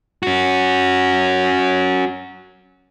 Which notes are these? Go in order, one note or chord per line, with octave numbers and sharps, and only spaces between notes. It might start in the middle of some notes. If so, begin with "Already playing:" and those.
C#4 F#4